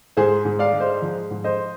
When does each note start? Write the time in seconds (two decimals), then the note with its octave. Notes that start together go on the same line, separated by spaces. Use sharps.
0.17 G#2 G#4 C5
0.45 G#2
0.59 D5 F5
0.73 G#3
0.80 C5 D#5
1.02 F3
1.31 G#2
1.44 C5 D#5